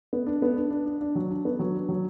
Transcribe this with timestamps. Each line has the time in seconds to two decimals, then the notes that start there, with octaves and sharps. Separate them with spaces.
0.13 B3
0.27 D4
0.42 B3
0.56 D4
0.71 D4
0.86 D4
1.01 D4
1.15 F#3
1.30 D4
1.45 B3
1.59 F#3
1.75 D4
1.89 F#3